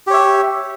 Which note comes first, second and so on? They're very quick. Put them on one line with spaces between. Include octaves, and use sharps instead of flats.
G4 C#5 E5